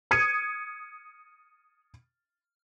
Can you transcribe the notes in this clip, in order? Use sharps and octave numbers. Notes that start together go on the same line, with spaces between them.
D#6 G#6 C#7 D#7